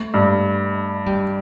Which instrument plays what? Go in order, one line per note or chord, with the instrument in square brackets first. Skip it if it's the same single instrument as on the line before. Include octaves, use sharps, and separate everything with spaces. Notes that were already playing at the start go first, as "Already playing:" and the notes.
Already playing: [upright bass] A3
[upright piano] G2
[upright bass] G3